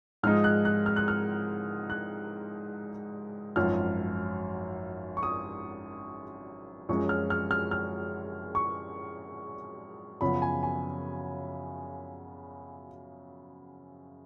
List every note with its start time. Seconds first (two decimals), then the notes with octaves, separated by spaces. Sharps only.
0.23 G#2 F3 G#3 D#4 F6
0.44 F#6
0.65 F#6
0.86 F6
0.96 F#6
1.08 F6
1.90 F#6
3.56 G#1 F#2 F3 F6
5.17 C#6
5.23 D#6
6.89 F#2 F3 G#3 C#4 C#6
7.09 F6
7.30 F6
7.51 F6
7.71 F6
8.55 C#6
10.21 F#2 C#3 F3 B3 B5
10.42 G#5
10.63 G#5